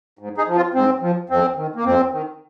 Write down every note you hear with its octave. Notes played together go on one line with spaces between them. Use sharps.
G#2
D#4 G#4
F3
C4 F4
G#2 C4
F3
F2 C4
D#3
A#3
F2 C4
D#3